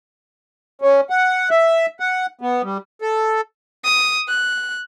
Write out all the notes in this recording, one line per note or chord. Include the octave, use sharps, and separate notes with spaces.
C#4
F#5
E5
F#5
B3
G3
A4
D#6
F#6